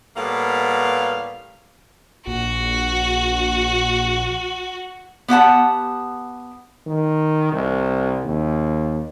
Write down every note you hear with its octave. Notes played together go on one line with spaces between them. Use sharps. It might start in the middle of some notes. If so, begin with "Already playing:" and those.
A2 G3 A#3 B3 F5
A#1 F#4
B3 G4 F#5 A5
D#3
C2
D#2